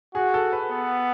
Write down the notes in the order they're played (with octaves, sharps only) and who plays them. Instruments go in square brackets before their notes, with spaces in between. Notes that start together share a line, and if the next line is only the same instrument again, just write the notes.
[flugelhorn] F#4 [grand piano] G#4
[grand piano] A4
B4
[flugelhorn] B3